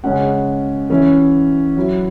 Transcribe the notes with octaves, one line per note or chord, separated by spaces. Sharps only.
C#3 G#3 C#4 F#5
E3 C#4 E4
F#3 E4